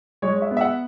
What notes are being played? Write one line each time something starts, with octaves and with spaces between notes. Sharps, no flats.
G#3 C#5
C#5
E5
B3
E5
F#5